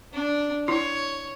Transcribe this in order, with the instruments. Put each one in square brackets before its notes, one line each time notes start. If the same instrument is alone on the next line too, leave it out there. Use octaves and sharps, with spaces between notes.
[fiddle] D4
[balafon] E4 [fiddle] C#5